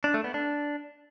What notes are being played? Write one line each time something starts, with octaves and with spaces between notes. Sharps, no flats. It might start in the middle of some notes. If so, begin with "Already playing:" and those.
D4
A3
B3
D4